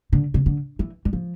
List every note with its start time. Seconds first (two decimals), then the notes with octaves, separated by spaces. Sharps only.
0.13 D3
0.34 C3
0.46 D3
0.79 E3
1.05 G3
1.13 F3